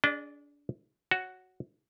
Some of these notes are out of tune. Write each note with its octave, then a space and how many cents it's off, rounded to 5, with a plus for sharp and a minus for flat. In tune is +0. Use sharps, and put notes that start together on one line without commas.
D4 -25 G#4 +0 D5 +35
F#4 +0 C#5 +0